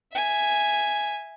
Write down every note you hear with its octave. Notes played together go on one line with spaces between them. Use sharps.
E5 G#5